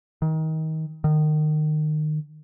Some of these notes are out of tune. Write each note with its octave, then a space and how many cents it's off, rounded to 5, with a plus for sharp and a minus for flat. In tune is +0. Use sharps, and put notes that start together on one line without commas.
D#3 +25
D#3 -25